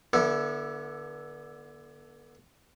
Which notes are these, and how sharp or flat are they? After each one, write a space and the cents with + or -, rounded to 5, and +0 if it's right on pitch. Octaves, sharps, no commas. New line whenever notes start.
D3 +0 B3 -40 E4 +0